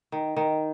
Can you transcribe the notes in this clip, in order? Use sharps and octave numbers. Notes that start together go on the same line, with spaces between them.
D#3
D#3